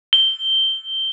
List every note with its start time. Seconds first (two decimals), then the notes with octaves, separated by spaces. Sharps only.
0.13 G7